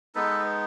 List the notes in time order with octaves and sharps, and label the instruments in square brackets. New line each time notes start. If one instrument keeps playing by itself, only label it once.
[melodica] G#3 B3 D#4 A4 B4